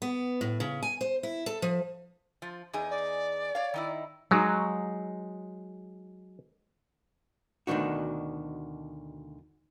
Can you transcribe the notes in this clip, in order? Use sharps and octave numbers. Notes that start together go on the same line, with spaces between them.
B3
A2
C#3
G#5
C5
E4
A4
F3
F3
E2 D#4 G#4
D5
C#5 F5
D#3 D#4 E4
F#3 G#3 D#4
D2 B2 D#3 D4 F#4